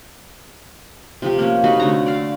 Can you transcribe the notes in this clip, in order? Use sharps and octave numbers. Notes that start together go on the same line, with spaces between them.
C3 F3 G4
A#3 C#4
C3 D#4 F#4 B4
D3 A3 C#5 A#5
D5 F5